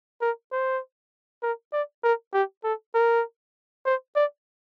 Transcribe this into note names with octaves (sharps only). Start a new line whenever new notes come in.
A#4
C5
A#4
D5
A#4
G4
A4
A#4
C5
D5